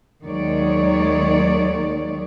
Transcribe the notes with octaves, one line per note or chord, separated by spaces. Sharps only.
D#2 D#3 F#3 G#3 C#5 D5